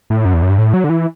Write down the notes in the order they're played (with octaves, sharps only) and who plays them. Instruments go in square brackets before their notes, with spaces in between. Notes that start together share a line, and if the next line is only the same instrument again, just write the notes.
[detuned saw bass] A2
F#2
E2
F#2
G2
A2
F#3
D3
E3